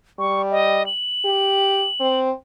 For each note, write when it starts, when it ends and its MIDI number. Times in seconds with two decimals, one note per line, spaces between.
0.19 0.86 55
0.19 0.42 85
0.51 0.85 75
0.86 2.19 102
1.25 1.86 67
2.00 2.31 60